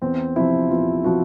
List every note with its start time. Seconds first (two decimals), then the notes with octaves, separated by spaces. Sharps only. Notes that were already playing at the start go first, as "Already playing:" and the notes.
0.02 E2 C4
0.36 C3 F3 E4
0.70 E2 F4
1.04 C3 F3 F#4